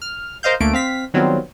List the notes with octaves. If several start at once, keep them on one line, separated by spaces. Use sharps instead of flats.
F6
A#4 C5 D#5 F5 G6
D2 A3 A#3 D7
C4 F5 B6
D#3 F#3 G3 B3 C4 F4